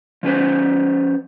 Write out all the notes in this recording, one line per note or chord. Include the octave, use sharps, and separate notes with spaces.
F3 C#4 B4 C5